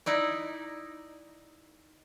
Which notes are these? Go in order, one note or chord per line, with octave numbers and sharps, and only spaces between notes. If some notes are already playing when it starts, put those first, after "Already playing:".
D#4 E4 D5